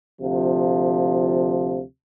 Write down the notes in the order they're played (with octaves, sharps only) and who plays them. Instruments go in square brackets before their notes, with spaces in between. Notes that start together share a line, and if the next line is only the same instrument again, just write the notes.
[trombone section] D2 C3 F3